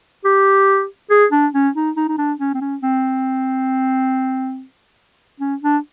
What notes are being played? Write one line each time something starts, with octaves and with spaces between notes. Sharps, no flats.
G4
G#4
D4
C#4
D#4
D#4
D#4
D4
C#4
C4
C#4
C4
C#4
D4